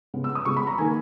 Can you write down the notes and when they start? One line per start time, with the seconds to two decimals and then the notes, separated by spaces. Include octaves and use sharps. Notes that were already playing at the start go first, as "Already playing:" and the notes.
0.14 C#3 G#3 B3
0.24 E6
0.35 D#6
0.45 C#3 G#3 B3 C#6
0.57 B5
0.67 A#5
0.78 D#3 A#3 G#5